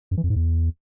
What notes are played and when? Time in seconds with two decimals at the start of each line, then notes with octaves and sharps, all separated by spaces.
0.11 F#2
0.17 E3
0.24 F2
0.30 G#2
0.36 E2